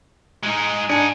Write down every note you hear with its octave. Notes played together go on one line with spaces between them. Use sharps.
G#3 D#4
D4 D#4 G#4 G#5